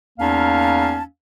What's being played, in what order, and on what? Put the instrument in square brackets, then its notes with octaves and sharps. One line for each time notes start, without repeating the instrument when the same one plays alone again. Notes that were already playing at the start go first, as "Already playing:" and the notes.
[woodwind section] E2 A#3 C#4 D#4 F5 A5